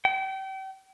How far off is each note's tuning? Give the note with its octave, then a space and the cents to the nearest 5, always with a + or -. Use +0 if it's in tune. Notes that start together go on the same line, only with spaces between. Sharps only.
G5 -35